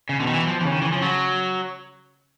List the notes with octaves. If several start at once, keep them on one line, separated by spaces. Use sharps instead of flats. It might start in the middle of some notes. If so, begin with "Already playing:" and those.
C#3
B2 D3
D#3
E3
F3
C#3 E3
D#3
E3
F3
F#3